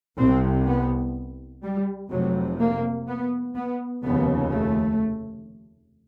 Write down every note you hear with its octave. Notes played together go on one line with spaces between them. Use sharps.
C2 C3 C4
B3
G3
F1 F2 C3 F#3
A#3
B3
B3
F1 D#2 C#3 B3
A3